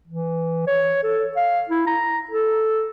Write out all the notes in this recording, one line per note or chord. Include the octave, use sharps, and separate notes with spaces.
E3
C#5
A4
F5
E4
A#5
A4